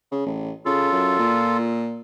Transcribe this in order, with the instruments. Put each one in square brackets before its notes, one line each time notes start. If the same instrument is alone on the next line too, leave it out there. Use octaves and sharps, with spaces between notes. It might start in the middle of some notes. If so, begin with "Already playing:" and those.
[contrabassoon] C#3
A1
[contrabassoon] C#3 [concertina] F4 A4
[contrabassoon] F#2
A#2